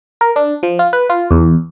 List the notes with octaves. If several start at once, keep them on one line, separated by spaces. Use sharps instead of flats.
A#4
D4
F3
F4
B4
F4
E2